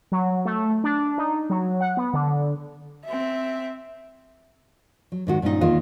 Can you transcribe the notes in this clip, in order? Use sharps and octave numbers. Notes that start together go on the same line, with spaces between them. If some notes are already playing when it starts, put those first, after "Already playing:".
F#3
A3
D4
D#4
F#3
F#5
B3
D3
C4 E5
F#3
G#2 D#3 F#4
G2 A#2 C4 C#4 D#4
E2 D#3 A#3 F4 D#5